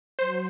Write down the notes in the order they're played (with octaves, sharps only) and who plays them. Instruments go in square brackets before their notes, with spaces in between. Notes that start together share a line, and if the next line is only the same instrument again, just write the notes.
[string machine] F#3 [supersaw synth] C5